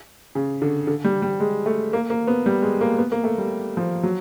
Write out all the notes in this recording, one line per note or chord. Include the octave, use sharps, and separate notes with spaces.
C#3
D3
D3
G3
G3
G#3
A3
A#3
A#3
B3
G3
G#3
A#3
B3
A#3
A3
G3
F3
F#3